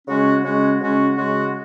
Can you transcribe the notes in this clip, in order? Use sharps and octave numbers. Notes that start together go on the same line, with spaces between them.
C#3 G#3 C#4 F#4
C#3 G#3 C#4 F#4
C#3 G#3 C#4 F#4
C#3 G#3 C#4 F#4